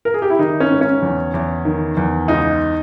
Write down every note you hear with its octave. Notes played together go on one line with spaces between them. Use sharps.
A#4
G#4
G4
E4
D#3 D#4
C#4
G#2
C#4
E2
E2
D#3
E2
C#2 D#4